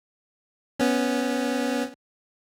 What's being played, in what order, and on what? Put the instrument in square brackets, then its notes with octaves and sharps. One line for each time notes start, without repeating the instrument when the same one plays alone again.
[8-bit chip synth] B3 C#4